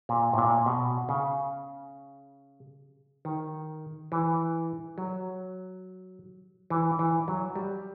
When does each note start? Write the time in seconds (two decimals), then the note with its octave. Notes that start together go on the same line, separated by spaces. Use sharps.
0.09 A#2
0.33 A2
0.38 A#2
0.66 B2
1.09 C#3
3.25 D#3
4.12 E3
4.98 F#3
6.70 E3
6.99 E3
7.28 F#3
7.56 G3